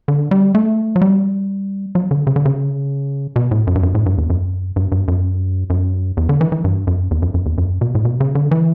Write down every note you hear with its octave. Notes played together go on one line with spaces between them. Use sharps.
D3
G3
A3
F#3
G3
F#3
D3
C#3
D3
C#3
B2
A2
F#2
G2
F#2
A2
G2
E2
F#2
G2
G2
F#2
F#2
E2
D3
E3
E3
G2
F#2
E2
F#2
F#2
E2
F#2
B2
A2
B2
C#3
D3
E3